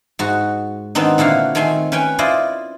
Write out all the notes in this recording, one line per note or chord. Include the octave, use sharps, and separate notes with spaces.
G#2 F#4
D#3 B3 C4 D4 D#4
A#2 D3 E4 F#4 F5
D#3 A3 C4 G#5 C6
C#4 B4 G5 G#5
E4 F4 C5 D5 D#5